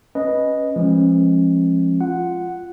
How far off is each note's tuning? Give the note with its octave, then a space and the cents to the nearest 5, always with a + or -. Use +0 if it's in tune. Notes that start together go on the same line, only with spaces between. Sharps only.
C#4 +0 B4 -10 D#5 +0
F3 -10 G#3 +0 C#4 -35
F4 +0 F#5 +0